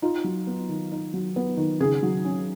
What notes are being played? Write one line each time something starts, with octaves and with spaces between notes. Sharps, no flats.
D#4 F4
F#3
B3
D#3
D#4
F#3
B3
D#3
C#3 G#4
F#3
C#4